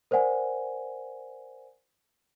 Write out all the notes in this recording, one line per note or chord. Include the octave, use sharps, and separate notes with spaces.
A#4 C5 D5 F#5 G#5